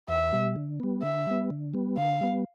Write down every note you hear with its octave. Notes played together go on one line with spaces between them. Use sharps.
E2 E5
B2 G3
D3
G3 B3
D3 E5
G3 B3
D3
G3 B3
D3 F5
G3 B3